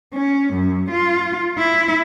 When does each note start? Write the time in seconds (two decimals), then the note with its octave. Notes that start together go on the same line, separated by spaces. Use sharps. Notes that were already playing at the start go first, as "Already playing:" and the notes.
0.14 C#4
0.53 F#2
0.91 F4
1.58 E4